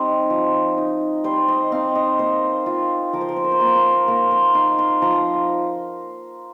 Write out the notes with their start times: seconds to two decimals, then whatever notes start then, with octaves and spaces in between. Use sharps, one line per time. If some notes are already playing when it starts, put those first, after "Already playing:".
Already playing: G3 C4 D#4
0.30 F3
0.78 D#4
1.24 G3 C5
1.48 D#5
1.72 C4 D#4 F5
1.95 D#5
2.19 A#3 C5
2.66 F4
3.13 F3 A#4
3.21 C5
3.29 A#4
3.36 C5
3.44 A#4
3.52 C5
3.59 A#3 F4 A#4
3.67 C5
3.75 A#4
4.08 A#3 A#4
4.31 C5
4.55 D#4 F5
4.78 C6
5.02 F3 A#5